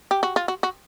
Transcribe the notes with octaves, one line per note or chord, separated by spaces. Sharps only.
G4
F#4
F4
F#4
F#4